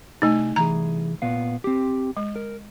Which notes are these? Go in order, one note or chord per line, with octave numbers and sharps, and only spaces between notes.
C2 A3 D#4 G#5
C2 E3 G#4 A#5
A#2 B3 F5
C4 G4
G#3
A#4